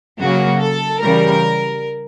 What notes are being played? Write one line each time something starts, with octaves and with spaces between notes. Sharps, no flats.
C#3 F#3 A#3 F#4
A4
C#3 E3 G3 A#4